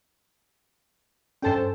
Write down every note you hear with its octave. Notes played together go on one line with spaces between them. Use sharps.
G2 C#4 A4 C5 G5 A5